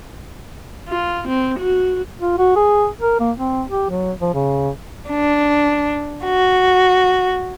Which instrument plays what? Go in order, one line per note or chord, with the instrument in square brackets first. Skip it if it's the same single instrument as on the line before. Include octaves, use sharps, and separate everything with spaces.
[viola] F4
C4
F#4
[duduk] F4
F#4
G#4
A#4
A#3
C4
G4
F#3
F3
C#3
[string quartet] D4
F#4